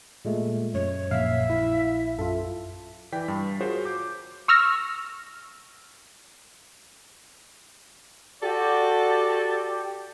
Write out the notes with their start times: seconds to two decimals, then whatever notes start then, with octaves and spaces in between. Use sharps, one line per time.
0.25 A#2 G#3 A3
0.74 F#2 C#5
1.11 A#1 E5 F5
1.50 E4
2.19 F#2 F4 A4
3.13 E3 D5 G5 B6
3.28 G2
3.61 F4 F#4 G#4 A#4 C5 C#5
3.85 D6 G6
4.48 C#6 E6 F6 A#6
8.43 F#4 G4 A4 D5